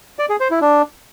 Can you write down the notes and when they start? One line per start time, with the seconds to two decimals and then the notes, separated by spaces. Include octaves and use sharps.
0.19 D5
0.30 G#4
0.40 C5
0.51 E4
0.61 D4